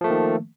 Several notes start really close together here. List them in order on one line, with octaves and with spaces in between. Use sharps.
F3 A3 A#3 D#3